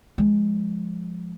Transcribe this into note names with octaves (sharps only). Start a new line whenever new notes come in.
F3 G#3